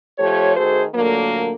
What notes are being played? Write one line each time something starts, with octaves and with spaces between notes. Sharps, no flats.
F3 A3 G4 C5 C#5
D#3 A3 F#4 G#4 A4 C5
A#2 D3 F#3 A3 A#3